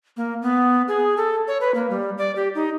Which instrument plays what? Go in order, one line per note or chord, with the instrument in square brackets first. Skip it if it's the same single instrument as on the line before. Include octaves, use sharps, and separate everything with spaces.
[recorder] A#3
B3
G#4
A4
C#5
B4
A#3
G3
D5
G4
D#4